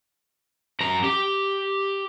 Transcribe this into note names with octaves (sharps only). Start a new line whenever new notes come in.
F#2 A#5
G4